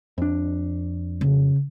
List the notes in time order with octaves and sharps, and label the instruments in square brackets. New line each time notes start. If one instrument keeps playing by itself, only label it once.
[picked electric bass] F2 D4
[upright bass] C#3